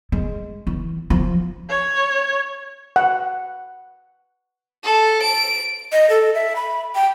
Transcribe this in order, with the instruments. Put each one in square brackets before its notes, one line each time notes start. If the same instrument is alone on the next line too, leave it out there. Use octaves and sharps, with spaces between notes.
[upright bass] G#3
E3
F3
[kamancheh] C#5
[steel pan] F#5
[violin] A4
D7
[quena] D#5
A4
E5
B5
G5